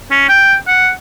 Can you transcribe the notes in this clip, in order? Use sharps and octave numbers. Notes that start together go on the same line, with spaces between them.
C#4
G5
F#5